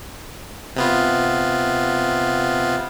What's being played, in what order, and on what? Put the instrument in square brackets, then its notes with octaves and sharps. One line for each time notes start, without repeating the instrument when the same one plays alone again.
[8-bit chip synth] C3 B3 F4